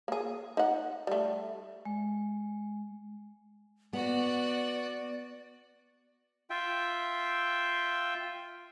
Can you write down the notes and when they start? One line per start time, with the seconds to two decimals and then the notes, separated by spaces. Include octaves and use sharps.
0.08 A#3 G#4
0.57 D#4 F#5
1.07 G3 A3
1.85 G#3
3.93 B3 F#4 D5 F#5
6.50 F4 E5 G5